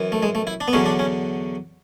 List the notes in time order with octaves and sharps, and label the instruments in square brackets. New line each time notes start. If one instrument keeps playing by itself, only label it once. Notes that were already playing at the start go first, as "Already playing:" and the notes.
Already playing: [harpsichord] F#2 E3
A3
G#3
A3
E4
D4
B3
E2 D3 F#3 C#4
D4
C#4